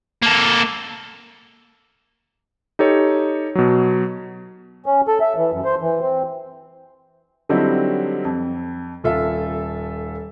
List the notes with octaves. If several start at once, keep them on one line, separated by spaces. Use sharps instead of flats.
A#3 A4
D#4 G4 A4 C#5
B2 F#3
C#4
A4
E5
E3
F#2
C5
E3
C4
D3 F#3 G3 C4 D#4 E4
F2
D#1 F4 A4 E5